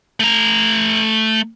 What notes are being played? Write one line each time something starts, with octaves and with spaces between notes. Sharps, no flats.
A3 A#5